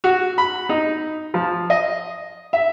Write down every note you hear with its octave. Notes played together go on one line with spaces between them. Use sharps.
F#4
B5
D#4
F3
D#5
E5